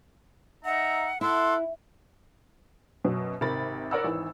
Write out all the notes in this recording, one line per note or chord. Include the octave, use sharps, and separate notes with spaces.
D#4 E5 F#5 A#5
E4 A4 F#5 C6
F#2 B2 F#3
G#1 C3 A#4 B5 A6
A#4 C#5 D5 F#5 B5 E6
G#1 E3